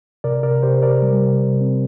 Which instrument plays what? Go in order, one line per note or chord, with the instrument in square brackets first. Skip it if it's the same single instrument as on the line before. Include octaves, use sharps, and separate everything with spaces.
[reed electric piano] C3 A#4 D5
C3 A#4 D5
C3 G4 C5
C3 A#4 D5
G3
C3
C3
C4